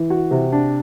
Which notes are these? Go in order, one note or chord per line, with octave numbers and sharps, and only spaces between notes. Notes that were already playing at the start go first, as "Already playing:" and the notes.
Already playing: E3
F#4
C3
D4